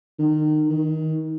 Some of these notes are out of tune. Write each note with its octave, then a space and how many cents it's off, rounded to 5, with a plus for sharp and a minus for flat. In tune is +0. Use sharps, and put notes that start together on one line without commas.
D#3 -25
D#3 +25